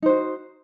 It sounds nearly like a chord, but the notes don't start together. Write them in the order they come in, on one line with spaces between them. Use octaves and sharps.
D#4 C5 F#4